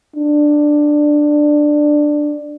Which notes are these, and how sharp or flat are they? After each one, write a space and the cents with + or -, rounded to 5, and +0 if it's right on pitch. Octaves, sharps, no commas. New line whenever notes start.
D4 +10